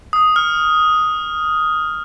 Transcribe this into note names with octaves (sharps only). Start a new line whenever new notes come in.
D#6
F6